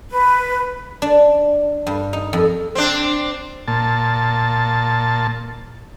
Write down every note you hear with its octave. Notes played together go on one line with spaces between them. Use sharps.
B4
D4
G2
D#4
F2
C4 D4
A#2 A5